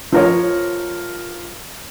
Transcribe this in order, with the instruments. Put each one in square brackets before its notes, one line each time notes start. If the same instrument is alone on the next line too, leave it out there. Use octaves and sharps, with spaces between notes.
[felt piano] F3 A#4 C#5